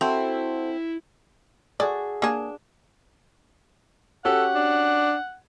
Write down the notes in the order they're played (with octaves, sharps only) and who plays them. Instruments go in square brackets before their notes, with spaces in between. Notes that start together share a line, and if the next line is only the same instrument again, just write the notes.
[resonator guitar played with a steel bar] C4 [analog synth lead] E4 [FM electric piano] F#4 A4 C5
[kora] F#4 G#4 A4 [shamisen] D5
[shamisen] A#3 G#4 [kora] D4
[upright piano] C#4 F#4 G4 [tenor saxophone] A4 [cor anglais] F#5
[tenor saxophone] D4